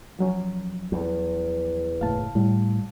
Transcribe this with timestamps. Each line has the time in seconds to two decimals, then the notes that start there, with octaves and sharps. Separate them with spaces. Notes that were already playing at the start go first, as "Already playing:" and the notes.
0.19 F3 F#3 C#4
0.92 E2
2.01 F#1 A2 F5 A5
2.35 A2 G3